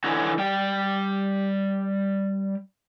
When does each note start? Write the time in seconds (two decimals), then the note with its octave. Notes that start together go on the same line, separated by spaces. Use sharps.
0.04 D3 E3 C#4 D#4 F#4
0.38 G3 G5